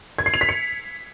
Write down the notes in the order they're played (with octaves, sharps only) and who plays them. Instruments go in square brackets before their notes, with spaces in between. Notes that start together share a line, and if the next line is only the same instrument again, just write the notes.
[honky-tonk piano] G#6
C7
F7
B6
C#7